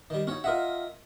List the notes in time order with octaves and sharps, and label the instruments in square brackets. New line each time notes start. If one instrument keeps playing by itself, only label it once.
[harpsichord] D#3 G3
[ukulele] C#4 D#4 [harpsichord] F#4 C#5
[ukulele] F4 F#5 [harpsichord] A#4 D#5 E5